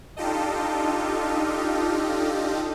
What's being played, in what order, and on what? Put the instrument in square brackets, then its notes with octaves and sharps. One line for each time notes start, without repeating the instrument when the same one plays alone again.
[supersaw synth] D4 D#4 F4 G4 A4 D#5